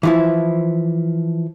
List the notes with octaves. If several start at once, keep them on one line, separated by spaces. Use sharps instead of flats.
E3 F3 E4